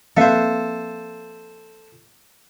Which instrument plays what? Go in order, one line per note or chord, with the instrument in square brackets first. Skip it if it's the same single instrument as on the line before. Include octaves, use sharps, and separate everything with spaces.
[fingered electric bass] F3 A#3 C4 [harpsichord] A4 C5 [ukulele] B4 E5 F5